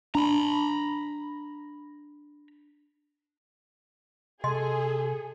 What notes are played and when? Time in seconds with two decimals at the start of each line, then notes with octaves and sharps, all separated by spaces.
0.15 D4 A#5 B5
4.44 C3 G#4 A4 D#5 G#5 C6